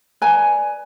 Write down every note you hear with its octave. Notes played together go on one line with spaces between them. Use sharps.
B4 D5 G#5 A#5